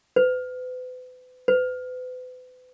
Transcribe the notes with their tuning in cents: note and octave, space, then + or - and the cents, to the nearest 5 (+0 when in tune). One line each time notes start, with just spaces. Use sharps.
B4 +40
B4 +40